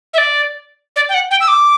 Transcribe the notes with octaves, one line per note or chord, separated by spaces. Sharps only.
E5
D5
D5
G5
F#5
G5
E6
D6